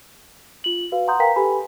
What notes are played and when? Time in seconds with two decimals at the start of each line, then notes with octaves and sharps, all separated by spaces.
0.64 F4 F#7
0.92 F#4 B4 F5
1.08 F#5 A#5 C6 D#6 G6
1.19 A#4 B4 F5 G5 A#5 B6
1.36 G4 A4 B4 G#5 B5